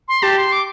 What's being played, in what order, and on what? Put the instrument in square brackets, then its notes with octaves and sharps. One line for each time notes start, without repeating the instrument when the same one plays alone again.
[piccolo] C6
[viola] G4 [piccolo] A5
[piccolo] C6
D6